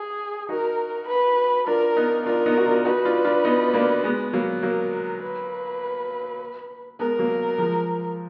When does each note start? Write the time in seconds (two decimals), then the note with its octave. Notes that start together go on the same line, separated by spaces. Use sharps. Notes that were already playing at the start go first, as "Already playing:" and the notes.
Already playing: G#4
0.49 D#4 F#4 A#4
1.08 B4
1.67 D4 F4 A#4
1.97 B3 D#4
2.26 D4 F4 A#4
2.46 B3 D#4
2.57 F#4
2.66 D4 F4
2.85 D#4 F#4 B4
3.05 D4 F4
3.24 D4 F4
3.44 B3 D#4
3.74 A#3 D4
4.04 G#3 B3
4.33 F#3 A#3
4.63 F#3 A#3 A#4
5.22 B4
6.99 G#3 B3 A#4
7.19 F#3 A#3
7.58 F3 G#3